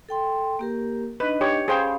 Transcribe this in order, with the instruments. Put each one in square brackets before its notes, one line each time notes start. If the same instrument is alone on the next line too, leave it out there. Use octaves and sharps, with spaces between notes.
[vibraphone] A4 G5 C6
A#3 G4 A#4
[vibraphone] D4 D#4 D#5 [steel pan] B4
[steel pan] G4 C#5
[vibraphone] C#4 F5 B5 [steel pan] G#4 C5 G5